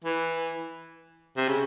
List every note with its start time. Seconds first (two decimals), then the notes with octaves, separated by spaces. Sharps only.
0.05 E3
1.37 C3
1.49 C#3